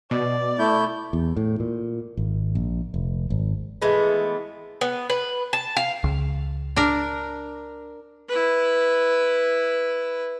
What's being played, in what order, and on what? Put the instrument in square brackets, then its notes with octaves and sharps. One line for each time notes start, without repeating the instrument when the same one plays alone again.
[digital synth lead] B2 [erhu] D5
[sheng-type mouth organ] A3 E4 G6
[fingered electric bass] E2
A2
A#2
G#1
A#1
F1
G#1
[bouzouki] E3 G#3 A3 B3
B3
B4
A5
F5
[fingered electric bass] C#2
[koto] D4 A#4
[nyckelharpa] E4 B4